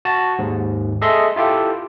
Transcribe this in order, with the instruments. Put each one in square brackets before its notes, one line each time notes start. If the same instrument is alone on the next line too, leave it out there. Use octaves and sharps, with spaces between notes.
[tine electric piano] F#4 A5
D#2 G#2
G#4 A4 D#5 E5 C6
E4 F4 G4 A4